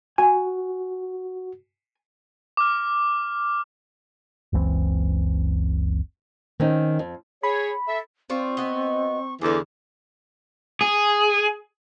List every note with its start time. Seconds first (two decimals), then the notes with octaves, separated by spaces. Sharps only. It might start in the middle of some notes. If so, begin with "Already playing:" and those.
0.18 F#4 G#5
2.57 D6 F6
4.53 F#1 C#2 E3 C4
6.60 D#3 C4 C#4 D#4
6.99 F2
7.43 G#4 C#5 B5
7.88 A4 E5
8.30 C4 F4 C5 D5 C#6
8.57 B3 F#4 D#5
9.41 E2 D3 E3 E4 G#4 D6
10.81 G#4